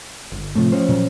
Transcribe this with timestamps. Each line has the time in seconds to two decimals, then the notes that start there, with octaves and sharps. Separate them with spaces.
0.32 G1
0.55 A2 C3 F3 A3
0.72 F3 C#4 C5
0.89 A#2 F#3